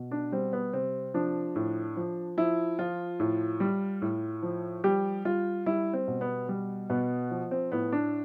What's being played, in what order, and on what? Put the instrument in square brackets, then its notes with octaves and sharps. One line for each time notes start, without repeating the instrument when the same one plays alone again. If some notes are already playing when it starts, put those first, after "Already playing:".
Already playing: [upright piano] B2
D4
G3 C4
B3
C3 C4
F3 D4
A2
F3
F3 E4
F3 F4
A2
G3
A2
F3
G3 G4
G3 F4
G3 E4
C4
B2
B3
G3
B2 B3
F3
C4
A2 B3
D4